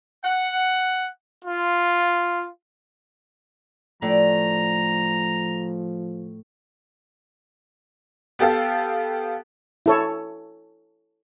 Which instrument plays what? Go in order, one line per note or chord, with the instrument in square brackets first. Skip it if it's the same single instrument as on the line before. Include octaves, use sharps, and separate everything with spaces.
[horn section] F#5
[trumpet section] F4
[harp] A2 [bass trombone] F3 [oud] D4 [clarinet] A#5
[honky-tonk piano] B3 G4 A4 F5
[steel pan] E4 A4 C#5